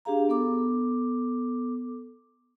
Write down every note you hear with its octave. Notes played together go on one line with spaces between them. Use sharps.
D4 G4 G#4 F5 A#5
B3 A4 D6